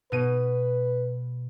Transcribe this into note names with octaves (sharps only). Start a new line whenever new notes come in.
B2 B4 D#7